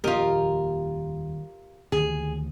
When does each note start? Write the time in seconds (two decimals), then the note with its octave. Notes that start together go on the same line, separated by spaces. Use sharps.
0.04 D#1 F2 A#3 F4 G4 A#4 D#5
1.92 D2 D#3 E3 G#4